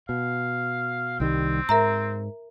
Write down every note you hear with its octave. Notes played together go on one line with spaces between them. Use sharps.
B2 F5
C2 D#3 G3 C4
G#2 A#4 E5 A#5